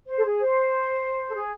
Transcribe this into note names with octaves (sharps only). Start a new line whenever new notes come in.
C5
A4
G#4
C5
A4
G#4